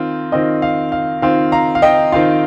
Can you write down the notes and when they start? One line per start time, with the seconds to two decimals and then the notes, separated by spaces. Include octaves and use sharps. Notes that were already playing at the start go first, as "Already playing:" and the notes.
Already playing: D#3 C4 F4
0.32 D#3 C4 F4 D#5
0.62 F5
0.92 F5
1.22 D#3 C4 F4 F5
1.52 F5 A#5
1.75 F5
1.82 D#5 G5
2.12 D#3 C4 F4 F5